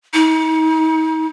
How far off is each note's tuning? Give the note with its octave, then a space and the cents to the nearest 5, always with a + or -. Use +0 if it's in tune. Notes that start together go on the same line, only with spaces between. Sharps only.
D#4 +40